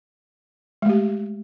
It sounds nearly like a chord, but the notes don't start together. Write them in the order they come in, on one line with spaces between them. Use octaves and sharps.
G#3 A3 G4